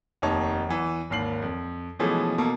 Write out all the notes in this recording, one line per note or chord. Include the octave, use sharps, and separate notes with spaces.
F1 D#2 D#4 C#5 A5
E2 E3
G#1 D#2 C7 F#7
F2
B2 E3 F3 G#3 A3 C#4
B2 A#3 A4